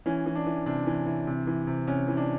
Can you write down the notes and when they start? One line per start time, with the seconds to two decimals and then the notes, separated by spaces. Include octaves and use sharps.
0.06 E3 C#4
0.26 E3
0.36 D4
0.46 E3
0.66 C3 D4
0.86 E3
1.06 E3
1.27 C3
1.47 E3
1.67 C3
1.87 C3 C#4
2.08 E3
2.17 D4